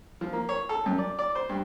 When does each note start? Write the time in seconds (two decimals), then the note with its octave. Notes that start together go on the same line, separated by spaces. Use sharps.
0.21 F3
0.33 A#3
0.49 C#5
0.69 A4
0.86 F#2
0.98 D5
1.19 D5
1.35 C5
1.49 G2